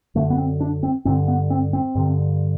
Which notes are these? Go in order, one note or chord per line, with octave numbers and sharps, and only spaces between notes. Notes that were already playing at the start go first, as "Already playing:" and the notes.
F#2 D3 A3
B3
C4
D4
C4
G2 D3 C4
B3
C4
C4
G2 D3